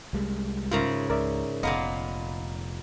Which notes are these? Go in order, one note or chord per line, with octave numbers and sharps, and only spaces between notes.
C2 G3 G#3
G#2 C#3 F4 A#4 E5 A#5
C#2 A#4 D5 E5
F1 A#2 A#3 B3 D#5 F5 A#5